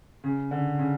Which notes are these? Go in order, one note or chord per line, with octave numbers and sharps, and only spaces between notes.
C#3
D3
C#3